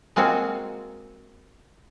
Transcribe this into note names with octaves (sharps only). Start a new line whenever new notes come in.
G#3 A#3 C4 F4 F#4 G#4